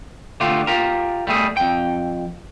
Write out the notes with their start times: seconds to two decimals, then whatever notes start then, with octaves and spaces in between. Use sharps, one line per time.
0.40 D3 A3 F4 G4
0.67 F4 G4 A#4
1.27 G3 A3 G#4
1.57 F2 G5